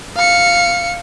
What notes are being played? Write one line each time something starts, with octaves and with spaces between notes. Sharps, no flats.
F5 C#7